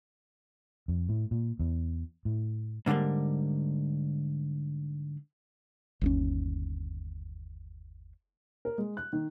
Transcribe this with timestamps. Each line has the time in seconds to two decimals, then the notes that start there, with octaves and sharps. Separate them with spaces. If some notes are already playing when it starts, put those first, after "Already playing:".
0.88 F2
1.09 A2
1.31 A#2
1.59 E2
2.25 A2
2.86 G#2 D3 D#3 G3 A#3
6.01 G1 D#2 C#4
8.65 A#4
8.78 G#3
8.97 F#6
9.13 D#3